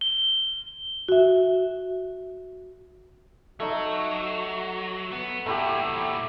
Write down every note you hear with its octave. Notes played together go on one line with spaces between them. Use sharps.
G7
F#4 E5
F#3 A3 D#4
B3
A#2 A3 E4 F#4 G4